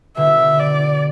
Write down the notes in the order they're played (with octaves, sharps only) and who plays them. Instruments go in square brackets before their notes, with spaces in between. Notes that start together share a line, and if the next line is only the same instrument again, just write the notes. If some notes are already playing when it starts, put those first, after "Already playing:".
[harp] B2 D3 [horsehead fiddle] E5
[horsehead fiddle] D5